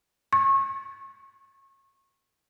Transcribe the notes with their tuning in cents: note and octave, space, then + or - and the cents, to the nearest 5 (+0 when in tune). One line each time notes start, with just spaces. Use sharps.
C#6 -25